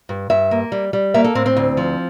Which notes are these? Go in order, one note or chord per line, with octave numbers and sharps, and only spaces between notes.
G2
G2 E5
A#3
G3
G3
A#3 E5
A4
A2 C4
C4
D2
F3